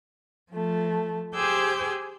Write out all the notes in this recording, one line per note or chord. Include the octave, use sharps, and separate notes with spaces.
F3 A3
G4 G#4 C5 D6 E6 G6